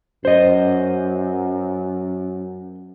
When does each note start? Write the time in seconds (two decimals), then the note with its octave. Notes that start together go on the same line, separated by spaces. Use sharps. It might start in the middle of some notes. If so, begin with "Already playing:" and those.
0.25 F#2 C5 D#5